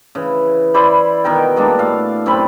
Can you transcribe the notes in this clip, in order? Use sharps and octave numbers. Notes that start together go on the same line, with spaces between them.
C#3 E3
E4 C5 D5 B5
B2 D#3 A#4 G5
G3 G#3 A#3 D4
A2 F5
F#2 C3 C4 B5